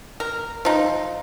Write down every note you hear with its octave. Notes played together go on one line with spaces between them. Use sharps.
A#4
F3 D#4